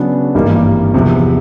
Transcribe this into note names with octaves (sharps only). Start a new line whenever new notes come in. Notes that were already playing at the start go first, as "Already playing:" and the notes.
Already playing: C#3 F#3 B3 D4
G#1 G2 E3 G3 A#3
E2 C3 F3